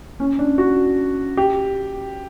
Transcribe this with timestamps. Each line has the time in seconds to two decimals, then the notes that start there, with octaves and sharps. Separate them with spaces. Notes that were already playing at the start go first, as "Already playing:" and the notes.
0.20 C#4
0.39 D4
0.58 F#4
1.37 G4